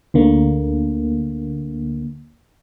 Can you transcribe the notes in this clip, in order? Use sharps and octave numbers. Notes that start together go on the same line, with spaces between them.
D2 D3 A#3